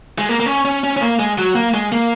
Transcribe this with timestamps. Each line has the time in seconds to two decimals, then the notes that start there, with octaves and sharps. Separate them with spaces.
0.18 G#3
0.29 A#3
0.40 A#3
0.46 C#4
0.65 C#4
0.84 C#4
0.97 C#4
1.01 A#3
1.19 G#3
1.38 F#3
1.55 A#3
1.74 G#3
1.92 A#3